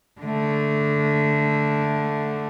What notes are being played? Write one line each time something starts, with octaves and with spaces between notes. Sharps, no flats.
D3 A3